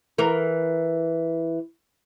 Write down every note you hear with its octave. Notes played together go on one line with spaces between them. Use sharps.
E3 A#4